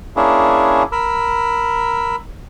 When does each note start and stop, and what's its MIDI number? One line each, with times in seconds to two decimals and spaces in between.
0.16 0.83 58
0.16 0.83 61
0.16 0.83 62
0.16 0.83 64
0.16 0.83 68
0.92 2.16 70
0.92 2.16 83
0.92 2.16 88